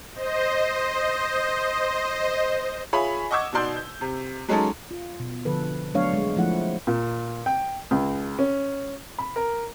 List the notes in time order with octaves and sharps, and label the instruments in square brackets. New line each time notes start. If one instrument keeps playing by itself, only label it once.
[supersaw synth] C5 D#5
[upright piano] F4 G#4 C#5 E5 G#5 B5
D#5 F#5 C#6 D6 E6 G#6
B2 D#4 F#4 D5 C6 G6
G6
C3
F#3 G#3 C#4 D#4 A4
[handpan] F4
B2
D3 F3 A4 B4
F#3 A3 B3 D4 C#5 F5
G#3
F3 A3 E4 F#5
[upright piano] A#2
G5
C#2
C#4
B5
A#4